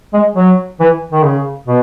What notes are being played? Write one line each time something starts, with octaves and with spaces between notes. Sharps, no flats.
G#3
F#3
E3
D#3
C#3
B2